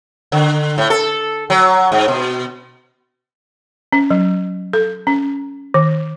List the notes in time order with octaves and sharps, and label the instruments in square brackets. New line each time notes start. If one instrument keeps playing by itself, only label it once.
[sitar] D3
A2
A4
F#3
G#2
B2
[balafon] C#4
F#3
A4
C#4
D#3